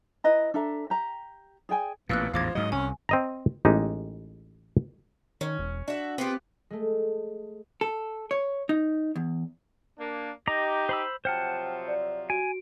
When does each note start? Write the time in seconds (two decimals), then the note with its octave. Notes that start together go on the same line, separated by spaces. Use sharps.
0.24 E4 B4 D#5 A#5
0.54 D4 A4 E5 A#5
0.90 G4 A#5
1.69 G#4 D5 G5 G#5
2.09 A1 A#2 B3 F5 E6 F#6
2.34 A1 E2 G#2 F3 F5 D6 G#6
2.55 G#2 F#3 D#5
2.72 C2 C#4 G#5
3.09 C4 D#5 A#5
3.65 A1 G#3 D#4 G4
5.41 D#3 C#4
5.59 E1
5.88 D4 F#4 E5
6.18 B3 C4 F4 G4
6.70 G#3 A3
7.81 A4
8.31 C#5
8.69 D#4
9.16 E2
9.99 A#3 D4
10.47 D#4 G4 D#5 A#5 D6
10.89 C5 B5 E6
11.25 C3 F3 F#3 C5 F#5 G5 A5 F6
11.88 D5
12.30 F#4 G#5 D7